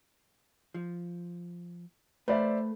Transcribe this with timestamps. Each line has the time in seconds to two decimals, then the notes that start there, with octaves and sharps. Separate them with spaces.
0.74 F3
2.28 A3 B4 C5 D5 E5